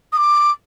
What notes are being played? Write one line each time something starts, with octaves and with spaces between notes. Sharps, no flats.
D#6
D6